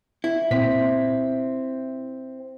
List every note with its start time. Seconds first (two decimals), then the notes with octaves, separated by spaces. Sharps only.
0.24 E4
0.51 A#2 C4 B6